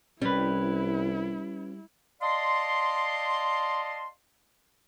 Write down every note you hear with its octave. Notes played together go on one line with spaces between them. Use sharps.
C2 G3 C#4 E4 B4
D5 D#5 F5 A5 C6